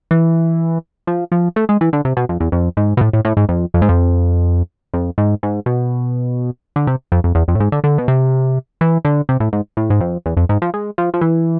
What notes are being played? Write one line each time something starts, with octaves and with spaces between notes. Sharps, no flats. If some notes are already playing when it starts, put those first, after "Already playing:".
E3
F3
F3
A3
G#3
E3
D3
C3
B2
F2
E2
F2
G#2
B2
A2
A2
A2
G#2
F2
F2
G#2
F2
F2
G#2
G#2
B2
D3
C3
F2
F2
E2
F2
A2
G#2
D3
D3
B2
C3
E3
D3
C3
A2
G#2
A2
G#2
F2
E2
F2
G#2
F3
G#3
F3
F3
E3